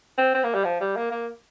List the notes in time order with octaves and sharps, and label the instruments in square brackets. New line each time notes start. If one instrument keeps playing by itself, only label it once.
[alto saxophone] C4
C4
A#3
G3
F3
G3
A#3
A#3